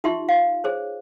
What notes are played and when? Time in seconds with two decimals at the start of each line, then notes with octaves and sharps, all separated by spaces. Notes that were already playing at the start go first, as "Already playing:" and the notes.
0.04 D#4 F4 G4 E5 C6
0.29 F5
0.64 G#4 C5 C#5